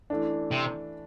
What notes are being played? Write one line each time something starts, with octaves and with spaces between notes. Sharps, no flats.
E3 A3 D4
C3